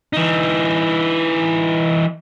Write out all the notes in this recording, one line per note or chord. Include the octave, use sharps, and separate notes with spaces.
E3 D#4